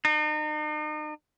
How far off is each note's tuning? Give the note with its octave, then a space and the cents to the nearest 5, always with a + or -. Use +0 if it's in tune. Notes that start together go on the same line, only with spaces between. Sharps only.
D#4 -40